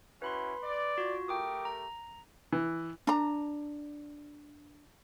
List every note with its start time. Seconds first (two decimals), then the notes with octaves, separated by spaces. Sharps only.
0.22 C#4 E4 F#4 B4 B5 C6
0.63 D5
0.98 F4 F#4
1.28 A3 G4 A#4 G5 D6 D#6
1.65 A#5
2.52 E3
3.07 D4 A#5